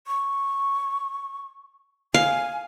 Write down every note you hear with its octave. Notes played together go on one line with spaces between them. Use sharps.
C#6
F5 G#5